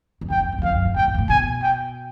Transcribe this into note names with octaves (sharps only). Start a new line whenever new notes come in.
F2
F#2 G5
F2
F2
E2
F2 F5
F#2
G#2
A2 G5
G#2
A#2
A2
B2 G#5
G5